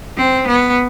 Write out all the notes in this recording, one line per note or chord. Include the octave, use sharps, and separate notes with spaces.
C4
B3